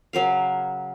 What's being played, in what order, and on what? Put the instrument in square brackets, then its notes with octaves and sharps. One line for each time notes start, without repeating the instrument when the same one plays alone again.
[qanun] C#3 F#3 A#4 F5